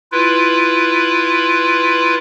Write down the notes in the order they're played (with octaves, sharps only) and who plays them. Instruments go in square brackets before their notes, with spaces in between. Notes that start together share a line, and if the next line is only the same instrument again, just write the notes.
[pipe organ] E4 F4 B4